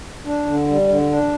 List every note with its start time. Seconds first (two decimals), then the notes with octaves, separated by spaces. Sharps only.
0.25 D4
0.46 D3
0.67 G3
0.88 D3
1.09 D4